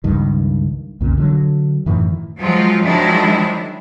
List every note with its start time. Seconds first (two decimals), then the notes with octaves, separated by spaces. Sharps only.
0.04 C#2 G2 D#3
1.01 B1 F2 A#2 C#3
1.18 D3 D#3 F#3
1.86 F#2 A2 D#3 E3
2.37 F3 F#3 G#3 F4
2.82 D#3 F3 F#3 G#3 D4 E4